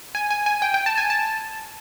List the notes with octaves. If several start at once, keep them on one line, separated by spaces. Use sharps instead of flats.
G#5
G#5
G#5
G5
G5
A5
G#5
A5